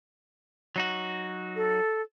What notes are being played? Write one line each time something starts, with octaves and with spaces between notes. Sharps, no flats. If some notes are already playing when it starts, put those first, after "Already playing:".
F#3 D#4 F#4
A4